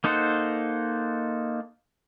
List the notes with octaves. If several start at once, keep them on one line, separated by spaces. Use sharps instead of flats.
A#3 D#4 A4 C5 F#5